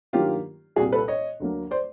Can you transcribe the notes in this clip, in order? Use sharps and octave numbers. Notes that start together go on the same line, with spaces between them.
G2 D#3 F#3 A#3 F4 G4
C2 A#2 G3 F#4 G#4
A4 B4
C#5 D#5
D2 D3 F#3 A#3
C5 D5